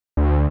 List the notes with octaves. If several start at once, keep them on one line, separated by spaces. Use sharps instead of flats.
D2